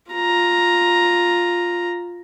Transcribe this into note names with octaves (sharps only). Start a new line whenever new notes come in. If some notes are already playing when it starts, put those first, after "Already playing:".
F4 A#5